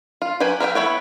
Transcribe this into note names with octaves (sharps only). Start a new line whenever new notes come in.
F4
F#3 G4 B4 G#5
A#4 B4 E5 G5
B3 E4 C#5 G5